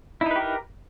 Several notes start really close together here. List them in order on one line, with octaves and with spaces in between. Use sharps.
E4 D#4 B4 G4 A#4